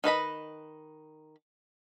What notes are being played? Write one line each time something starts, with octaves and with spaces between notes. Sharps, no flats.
D#3 B4 D#5 B5